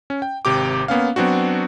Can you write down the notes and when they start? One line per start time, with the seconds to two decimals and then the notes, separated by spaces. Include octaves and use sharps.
0.10 C#4
0.22 G5
0.45 G#1 C3 G4 D6
0.88 A#3 B3 C#4 F5
1.16 F#3 B3 C4 D4 F#4